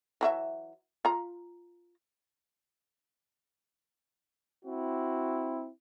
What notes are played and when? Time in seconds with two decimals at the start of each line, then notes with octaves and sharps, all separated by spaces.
0.21 E3 F#3 E5
1.05 F4 A#5
4.64 C4 E4 F#4